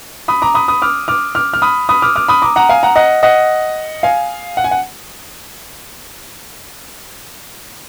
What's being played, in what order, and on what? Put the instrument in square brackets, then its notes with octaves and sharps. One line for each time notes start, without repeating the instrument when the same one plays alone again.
[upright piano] B5 D#6
A#5 D6
B5 D#6
B5 D#6
D6 F6
D6 F6
D6 F6
F6
B5 D#6
B5 D#6
D6 F6
D6 F6
B5 D#6
A#5 D6
F#5 A#5
F5 G#5
F#5 A#5
D#5 F#5
D#5 F#5
F5 G#5
F#5
G#5
F#5